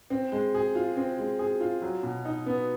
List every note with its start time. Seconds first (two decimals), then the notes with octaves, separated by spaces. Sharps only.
0.10 C4
0.32 G#3
0.54 G#4
0.75 F4
0.97 C4
1.19 G#3
1.39 G#4
1.61 F4
1.82 F#3
2.03 B2
2.25 D#4
2.46 B3